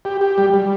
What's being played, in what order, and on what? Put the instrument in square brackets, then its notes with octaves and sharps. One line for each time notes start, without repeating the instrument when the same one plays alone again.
[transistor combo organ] G4
G4
G3
G3